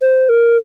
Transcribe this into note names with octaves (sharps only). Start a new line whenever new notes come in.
C5
A#4